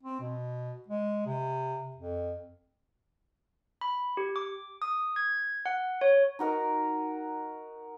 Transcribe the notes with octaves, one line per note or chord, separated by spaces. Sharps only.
C4
B2
G#3
C3
F2
B5
G4
D6
D#6
G#6
F#5
C#5
D#4 F#4 A#4 D#5